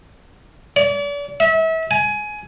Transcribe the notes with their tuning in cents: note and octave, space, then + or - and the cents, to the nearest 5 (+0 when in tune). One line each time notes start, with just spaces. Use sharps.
D5 -40
E5 -30
G#5 +20